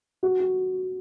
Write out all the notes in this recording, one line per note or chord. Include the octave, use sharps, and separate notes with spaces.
F#4
F#4